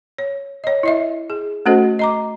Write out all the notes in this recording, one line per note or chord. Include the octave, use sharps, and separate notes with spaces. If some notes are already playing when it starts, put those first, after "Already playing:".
C#5
C#5 D#5
E4 D#5 E5
G#4
A3 C#4 F#4 A4 C5 D#5
D#5 A#5 D6